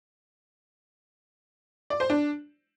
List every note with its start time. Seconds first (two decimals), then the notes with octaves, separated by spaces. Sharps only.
1.90 D5
2.00 C5
2.10 D4